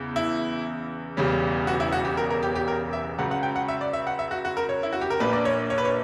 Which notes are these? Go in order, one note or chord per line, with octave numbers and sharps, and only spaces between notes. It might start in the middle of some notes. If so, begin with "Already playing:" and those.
Already playing: E2 C#3
E4
E1 E2 C#3 G3 C#4
F#4
E4
F#4
G4
A#4
A#4
G4
G4
A#4
E5
C#2 C#3 F#3 F#5
F#5
G5
F#5
E5
D5
E5
F#5
E5
F#4
F#4
A#4
C#5
E4
F#4
G4
A#4
A#1 A#2 A#3 D4 B4
D5
C#5
C#5
B4
C#5